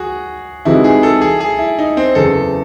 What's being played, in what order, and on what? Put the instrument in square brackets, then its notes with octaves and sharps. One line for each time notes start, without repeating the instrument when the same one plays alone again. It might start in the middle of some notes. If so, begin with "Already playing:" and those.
Already playing: [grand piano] F#4 G#4
[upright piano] C3 E3 G#3 D#4 F#4 [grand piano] E4
[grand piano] G#4
A4
G#4
G#4
E4
D#4
C4
[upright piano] F#1 E2 C#3 [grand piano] A4